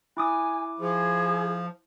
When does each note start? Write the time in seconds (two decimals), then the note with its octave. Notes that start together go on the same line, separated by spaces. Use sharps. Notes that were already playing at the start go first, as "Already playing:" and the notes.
0.17 E4 G#5 D6 D#6
0.79 F3 G#4